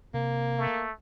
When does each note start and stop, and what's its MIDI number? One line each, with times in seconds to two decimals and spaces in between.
0.14 0.67 48
0.14 0.84 58
0.57 0.92 57